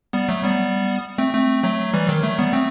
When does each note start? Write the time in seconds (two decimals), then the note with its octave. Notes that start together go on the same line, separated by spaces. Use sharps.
0.13 G3 B3
0.29 F#3 A3
0.44 G3 B3
1.18 A3 C4
1.34 A3 C4
1.63 F#3 A3
1.93 E3 G3
2.08 D#3 F#3
2.23 F#3 A3
2.39 G3 B3
2.53 A3 C4